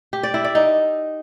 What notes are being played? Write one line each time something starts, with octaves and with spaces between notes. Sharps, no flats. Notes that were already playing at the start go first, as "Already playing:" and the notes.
G4
D5
E4
D5
D#4